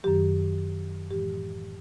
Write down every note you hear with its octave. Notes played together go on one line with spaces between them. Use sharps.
F#2 D#3 F#3 G4
A2 E3 G#3 G4